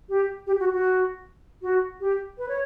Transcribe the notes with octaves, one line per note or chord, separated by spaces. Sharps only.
G4
G4
F#4
F#4
F#4
G4
B4
C#5